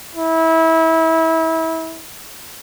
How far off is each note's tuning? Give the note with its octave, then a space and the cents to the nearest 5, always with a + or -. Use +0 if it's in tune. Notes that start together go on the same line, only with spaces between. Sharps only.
E4 -25